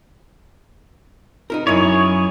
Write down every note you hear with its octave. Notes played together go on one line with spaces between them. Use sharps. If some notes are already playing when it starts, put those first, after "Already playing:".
D#4 E4 A#4
F#2 D#4 E4 G#4 C#5